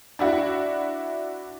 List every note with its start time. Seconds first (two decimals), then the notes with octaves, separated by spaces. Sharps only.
0.19 D4 E4 F#4